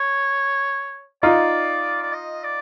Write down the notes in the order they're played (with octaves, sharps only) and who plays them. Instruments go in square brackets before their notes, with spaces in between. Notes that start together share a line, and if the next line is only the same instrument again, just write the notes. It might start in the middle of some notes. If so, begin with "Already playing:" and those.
Already playing: [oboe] C#5
[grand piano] D#4 F4 [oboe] D5
[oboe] D5
D#5
D5